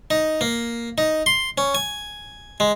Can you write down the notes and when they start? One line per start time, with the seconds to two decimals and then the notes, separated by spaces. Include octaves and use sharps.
0.11 D#4
0.41 A#3
0.98 D#4
1.26 C6
1.58 C#4
1.75 G#5
2.60 G#3